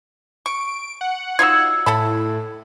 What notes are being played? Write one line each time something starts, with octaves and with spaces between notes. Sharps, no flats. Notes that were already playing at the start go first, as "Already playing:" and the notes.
C#6 D7
F#5
F#3 D#4 F4 E6 G#6
A2 A4 A5 B5